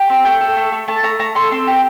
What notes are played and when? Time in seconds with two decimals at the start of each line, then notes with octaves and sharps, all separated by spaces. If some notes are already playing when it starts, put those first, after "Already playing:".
Already playing: G4
0.09 C4
0.25 A3 G5
0.41 A4
0.57 A3
0.72 A3
0.88 A3 A5
1.03 A3 A#5
1.19 A3 A#5
1.35 A4 C6
1.51 C4 C6
1.67 G4